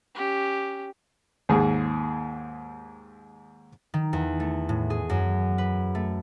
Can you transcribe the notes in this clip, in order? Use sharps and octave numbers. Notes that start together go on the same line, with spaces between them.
C#4 G4
D#2 G#2 G#4
D#3
E2
A3
A2
G#4
F#2
B4
A3